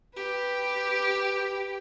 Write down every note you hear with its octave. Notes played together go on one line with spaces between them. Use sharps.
G4 B4